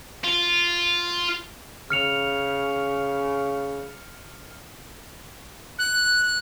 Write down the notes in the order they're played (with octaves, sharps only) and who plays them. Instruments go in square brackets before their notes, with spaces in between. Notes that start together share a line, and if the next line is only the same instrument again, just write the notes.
[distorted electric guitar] F4
[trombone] C#3 [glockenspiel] F6 C#7 F7
[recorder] F#6